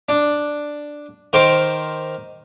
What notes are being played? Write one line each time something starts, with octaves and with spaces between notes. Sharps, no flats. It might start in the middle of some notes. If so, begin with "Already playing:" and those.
D4
D#3 A#4 C5 D6